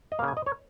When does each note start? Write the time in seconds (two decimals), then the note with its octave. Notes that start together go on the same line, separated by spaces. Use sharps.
0.12 D#5
0.19 A#3 F5
0.22 C#3
0.28 G#5
0.37 D#5
0.46 C#5